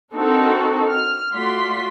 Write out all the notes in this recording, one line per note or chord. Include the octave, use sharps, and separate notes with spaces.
C4 D4 D#4 F#4 A4 A#4
F6
A3 F4 F#4 D5 C6 B6